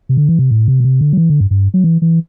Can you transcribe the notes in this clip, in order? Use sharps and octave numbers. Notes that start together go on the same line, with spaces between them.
C3
D3
E3
C3
A2
C3
B2
C3
D3
F#3
E3
D3
G2
G2
F#3
E3
E3